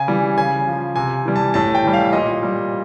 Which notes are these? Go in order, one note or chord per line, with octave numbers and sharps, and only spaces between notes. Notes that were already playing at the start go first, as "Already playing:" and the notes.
Already playing: C#3 G#5
E3 G3
C#3 G#5
F3
C3 G#5
E3 G3
A5
A2 A5
G5
E3 G3
F5
A#2 D#5
G3